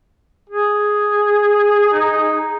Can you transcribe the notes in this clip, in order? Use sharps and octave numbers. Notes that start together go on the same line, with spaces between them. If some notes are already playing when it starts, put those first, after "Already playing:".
G#4
D#4